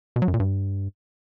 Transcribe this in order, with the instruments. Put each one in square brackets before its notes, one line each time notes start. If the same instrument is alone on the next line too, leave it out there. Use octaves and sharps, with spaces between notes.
[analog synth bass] B2
F#3
F#2
A#2
G2